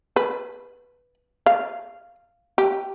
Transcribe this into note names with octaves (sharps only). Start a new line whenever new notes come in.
B4
F5
G4